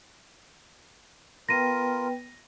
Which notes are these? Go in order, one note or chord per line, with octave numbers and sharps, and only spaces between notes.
B3 F4 A#4 B4 G5 A#6 D#7